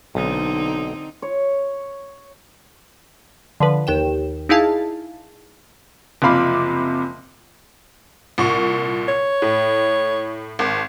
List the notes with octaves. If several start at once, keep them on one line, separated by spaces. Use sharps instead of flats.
B1 D3 C4 D#4
C#5
D3 F3 B4
D#2 G5 E7
D#4 E4 G#4 F5 A5
F#1 C3 F3 F5 B5 D6
C2 A#2 C#6
C#5
A2
G#1